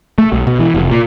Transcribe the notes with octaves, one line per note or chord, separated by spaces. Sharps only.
A3
B1
B2
E3
F1
A#2